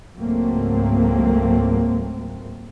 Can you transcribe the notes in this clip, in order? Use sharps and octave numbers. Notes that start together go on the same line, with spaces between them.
C#2 G#2 F#3 A3 A#3 C4